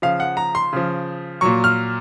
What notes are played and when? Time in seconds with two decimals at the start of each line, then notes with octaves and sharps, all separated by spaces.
0.02 C#3 F3 F5
0.20 F#5
0.37 A#5
0.55 C6
0.73 C#3 F3
1.41 A#2 F#3 C#6
1.64 F6